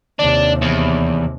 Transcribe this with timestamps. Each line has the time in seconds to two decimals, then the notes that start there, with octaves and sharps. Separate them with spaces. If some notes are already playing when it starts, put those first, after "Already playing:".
0.19 D#2 C3 D4
0.62 E2